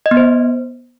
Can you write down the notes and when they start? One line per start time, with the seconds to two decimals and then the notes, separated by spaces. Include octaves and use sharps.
0.06 D#5
0.11 B3
0.17 C5